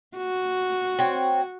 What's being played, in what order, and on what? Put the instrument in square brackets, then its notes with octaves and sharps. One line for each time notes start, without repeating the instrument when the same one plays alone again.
[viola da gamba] F#4
[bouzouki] C4 C#5